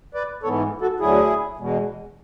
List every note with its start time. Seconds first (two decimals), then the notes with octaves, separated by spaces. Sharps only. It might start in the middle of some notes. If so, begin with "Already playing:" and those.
0.14 B4 D5
0.43 G#2 E3 B3 A4 C#5
0.81 F#4 A4
1.00 D2 D3 F#3 E4 G#4
1.57 E2 B2 G#3